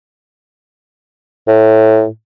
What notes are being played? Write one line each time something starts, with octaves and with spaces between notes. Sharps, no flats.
A2